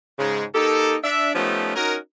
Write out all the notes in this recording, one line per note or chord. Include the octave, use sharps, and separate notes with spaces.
G#2 C#3 G#3
A#3 D#4 G4 A4
D4 E5
F3 A3 B3 C#4 D#4 G4
C#4 D#4 F#4 A#4